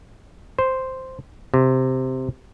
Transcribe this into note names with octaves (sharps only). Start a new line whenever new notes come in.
C5
C3